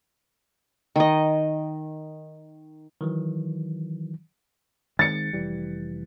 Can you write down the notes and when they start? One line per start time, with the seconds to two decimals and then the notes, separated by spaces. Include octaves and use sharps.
0.96 D#3 D#5
3.01 D#3 E3 F#3
4.99 D#3 G#3 C4 A6 C#7
5.33 F1 E3 G3